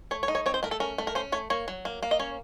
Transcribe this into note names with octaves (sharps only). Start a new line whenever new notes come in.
A3 C#5
C#5
D#4
C#5
C4 C#5
C5
A3 A#4
A4
C#4 A#4
A3
A#4
C#4 C5
A3 C#5
A#3 C#5
F#3
A#3
A#3
D#5
C#4 C#5